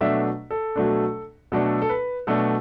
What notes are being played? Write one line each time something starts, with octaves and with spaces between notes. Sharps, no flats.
B2 F#3 A3 D4 E5
A4
B2 F#3 A3 D4
B2 F#3 A3 D4 A4
A4
B4
B2 F#3 A3 D4 A4